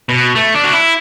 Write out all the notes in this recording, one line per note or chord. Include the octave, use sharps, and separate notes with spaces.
B2
A3
D4
F#4
E4